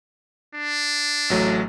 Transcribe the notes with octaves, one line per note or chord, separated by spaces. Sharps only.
D4
A1 F#3 A3